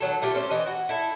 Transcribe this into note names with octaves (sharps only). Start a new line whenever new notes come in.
D#3 F#3 A4
A3 F4 G4 G5
C#4 A4 C5
E3 D#5 G5
F#4
E4 A4